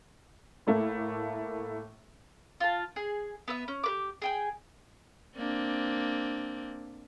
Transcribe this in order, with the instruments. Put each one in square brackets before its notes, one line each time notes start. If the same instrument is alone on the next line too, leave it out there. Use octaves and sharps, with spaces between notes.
[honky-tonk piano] A2 A3 A#3
[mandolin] F4 A5
G#4
B3 B4 E5
C#4
G4 B4 D6
G#4 G5 G#5
[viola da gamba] A#3 C4 D4